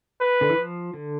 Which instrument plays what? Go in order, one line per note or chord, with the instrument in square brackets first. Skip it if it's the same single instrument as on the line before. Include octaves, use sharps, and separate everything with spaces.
[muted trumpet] B4
[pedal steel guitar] D3
E3
F3
D3